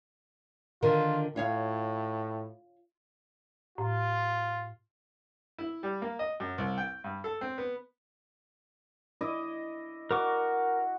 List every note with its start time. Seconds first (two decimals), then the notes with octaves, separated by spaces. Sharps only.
0.82 D3 D#3 F4 A#4
1.36 A2 F4 C#5 F5
3.78 A2 F4
5.58 E4
5.83 G3
6.02 A#3
6.19 D#5
6.40 F#2
6.58 C2
6.78 G5
7.04 G2
7.24 A4
7.41 C4
7.58 B3
9.21 E4 D#5 D6
10.11 F#4 A#4 D6